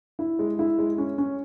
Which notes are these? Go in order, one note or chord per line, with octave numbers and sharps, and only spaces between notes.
E4
G#3
E4
G#3
C#4
C#4